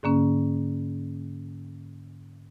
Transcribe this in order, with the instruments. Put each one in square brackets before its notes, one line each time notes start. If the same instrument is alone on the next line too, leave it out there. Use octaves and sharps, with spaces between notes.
[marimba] G#2 D3 A#3 C#4